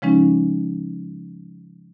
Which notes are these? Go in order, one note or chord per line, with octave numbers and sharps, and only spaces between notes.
C#3 F3 G#3 C#4 D#4